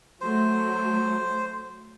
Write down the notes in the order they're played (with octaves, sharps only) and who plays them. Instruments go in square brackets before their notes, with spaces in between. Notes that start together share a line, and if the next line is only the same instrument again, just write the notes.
[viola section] F#3 A3 [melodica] C5